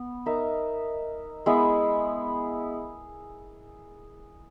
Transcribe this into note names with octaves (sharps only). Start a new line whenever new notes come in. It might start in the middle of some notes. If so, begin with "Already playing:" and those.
Already playing: B3
D#4 A#4 E5
G#3 B3 E4 G#4